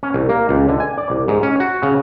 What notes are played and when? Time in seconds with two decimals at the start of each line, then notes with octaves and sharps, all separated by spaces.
0.03 C#4
0.14 C2
0.29 A#3
0.49 C#2
0.68 D3
0.80 G#5
0.98 D5
1.10 C2
1.28 G#2
1.43 C#4
1.60 F#4
1.83 C#3